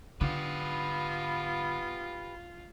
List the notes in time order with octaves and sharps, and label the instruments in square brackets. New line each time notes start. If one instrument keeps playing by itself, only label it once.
[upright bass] D3 [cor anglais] B3 [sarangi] F4 [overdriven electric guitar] G4 B4